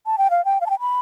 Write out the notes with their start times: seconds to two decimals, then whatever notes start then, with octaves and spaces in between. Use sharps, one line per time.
0.06 A5
0.18 G5
0.30 F5
0.45 G5
0.61 F5
0.66 A5
0.70 G5
0.80 B5